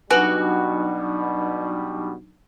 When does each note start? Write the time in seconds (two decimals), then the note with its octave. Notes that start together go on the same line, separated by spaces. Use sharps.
0.10 B2 F#3 G3 D4 D#4 F#4 B4 G#5